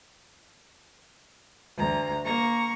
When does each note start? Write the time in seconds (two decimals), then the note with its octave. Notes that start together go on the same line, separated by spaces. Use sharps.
1.78 D2 A#5
2.25 A#3 A#5 C#6